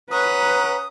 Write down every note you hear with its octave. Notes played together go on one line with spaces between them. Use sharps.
C#4 B4 F#5 A#5 D#6